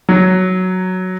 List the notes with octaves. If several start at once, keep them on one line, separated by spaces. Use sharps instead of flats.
F#3